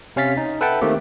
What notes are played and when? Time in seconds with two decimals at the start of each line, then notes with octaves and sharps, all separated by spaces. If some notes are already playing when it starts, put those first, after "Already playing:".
0.16 C3 C#4 F5 A6 B6
0.37 D#4
0.61 A4 B4 E5 F#5 G5 A5
0.82 D#3 A3 A#3 C4 G4